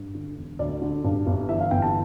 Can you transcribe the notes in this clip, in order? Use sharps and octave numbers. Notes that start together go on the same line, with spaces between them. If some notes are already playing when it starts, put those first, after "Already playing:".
Already playing: G2
D3
E1
D2 D5
D3
G2
G1
E3 E5
F5
G1 G5
A5